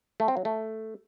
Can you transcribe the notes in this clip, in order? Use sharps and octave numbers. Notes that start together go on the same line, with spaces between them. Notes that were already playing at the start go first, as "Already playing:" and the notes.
A3
C4
F#3
A3